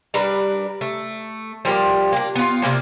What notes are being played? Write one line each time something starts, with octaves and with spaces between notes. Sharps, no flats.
G3 D4 A#4 B4
A3
F3 G3 A#3 G4
A#3 D4
B3 F4
C3 G#3 A#3 D4